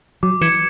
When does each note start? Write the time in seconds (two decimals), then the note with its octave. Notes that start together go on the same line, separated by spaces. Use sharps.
0.23 F#3 D6
0.41 E3 G#6 C#7 E7